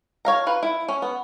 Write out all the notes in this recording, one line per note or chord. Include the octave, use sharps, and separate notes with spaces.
C#5 F5 A#5
F4 B4
E4
C#4
B3